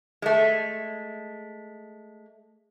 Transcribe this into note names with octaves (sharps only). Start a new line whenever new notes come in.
G#3 A3